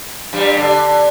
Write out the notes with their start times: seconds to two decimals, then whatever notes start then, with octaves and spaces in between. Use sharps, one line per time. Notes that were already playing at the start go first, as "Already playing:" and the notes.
0.33 G2 G3
0.57 D3